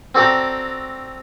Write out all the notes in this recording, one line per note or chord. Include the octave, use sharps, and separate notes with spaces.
C4 F#4 A4 D5 G5 A#5